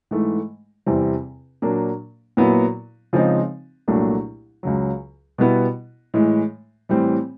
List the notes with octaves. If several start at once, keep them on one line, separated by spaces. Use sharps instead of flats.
G#2 E3 A3
E2 C3 E3 G3 C4
A#2 F#3 A#3 D4
A#2 F#3 B3 E4
C#3 F3 G#3 C4 D#4
C2 A#2 F#3 A3 D4
C#2 C#3 F#3
B2 G3 B3 E4
A2 E3 G#3
A2 E3 G3 C4